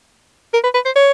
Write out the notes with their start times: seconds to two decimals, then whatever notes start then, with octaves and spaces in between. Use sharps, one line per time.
0.54 A#4
0.64 B4
0.74 B4
0.86 C5
0.96 C#5